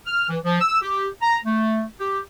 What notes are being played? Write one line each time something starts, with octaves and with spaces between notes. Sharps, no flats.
F6
E3
F3
E6
G4
A#5
A3
G4